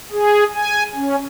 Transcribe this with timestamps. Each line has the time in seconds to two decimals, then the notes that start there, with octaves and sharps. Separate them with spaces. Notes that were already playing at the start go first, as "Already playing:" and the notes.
0.12 G#4
0.54 G#5
0.95 C#4